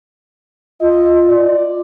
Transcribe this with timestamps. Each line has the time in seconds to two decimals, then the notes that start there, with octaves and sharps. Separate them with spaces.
0.81 F4 D#5
1.28 D5